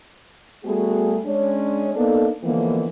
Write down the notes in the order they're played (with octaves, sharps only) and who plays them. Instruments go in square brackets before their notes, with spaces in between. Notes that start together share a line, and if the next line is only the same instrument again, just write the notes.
[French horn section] G3 A3 B3 F#4 G#4
G#3 C#4 D4
A#3 B3 D4 D#4 A4
D3 E3 F3 G#3 A#3 B3